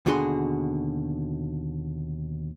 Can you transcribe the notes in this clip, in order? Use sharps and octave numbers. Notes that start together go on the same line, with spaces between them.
D#2 B2 D3 F#4 G#4 C6